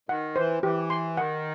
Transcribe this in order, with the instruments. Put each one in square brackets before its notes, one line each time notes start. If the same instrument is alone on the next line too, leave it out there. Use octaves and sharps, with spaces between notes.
[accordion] D#3 [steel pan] F#5
[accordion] E3 [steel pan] C5
[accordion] E3 [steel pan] G4
[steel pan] C6
[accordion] D#3 [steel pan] F#5